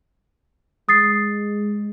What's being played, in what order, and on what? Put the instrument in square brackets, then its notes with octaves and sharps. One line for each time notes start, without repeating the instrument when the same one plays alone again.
[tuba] G#3 [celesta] D#6 A6 C7